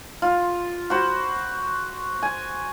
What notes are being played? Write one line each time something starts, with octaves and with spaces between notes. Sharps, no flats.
F4
F#4 C5 B5
G#5